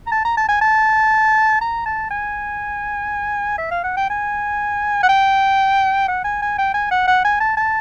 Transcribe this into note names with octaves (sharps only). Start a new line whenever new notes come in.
A#5
A5
A#5
A5
G#5
A5
A#5
A5
G#5
E5
F5
F#5
G5
G#5
F#5
G5
F#5
G#5
G#5
G5
G#5
F#5
F#5
G#5
A5
A5